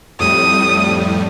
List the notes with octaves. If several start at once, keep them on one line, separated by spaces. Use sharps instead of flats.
F2 A2 G3 D#6